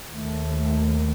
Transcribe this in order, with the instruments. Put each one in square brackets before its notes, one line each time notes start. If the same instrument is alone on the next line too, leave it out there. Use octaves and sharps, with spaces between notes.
[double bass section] D#2 A3